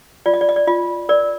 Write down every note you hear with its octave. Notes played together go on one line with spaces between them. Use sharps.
F4 D5
D#5
D5
D#5
D5
F4 D#5
A#4 D5